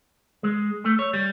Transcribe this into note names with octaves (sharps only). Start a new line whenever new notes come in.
G#3
A3
C#5
G3